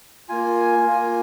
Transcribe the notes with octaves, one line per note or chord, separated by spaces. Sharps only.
A#3 F4 G#5
A#3 F4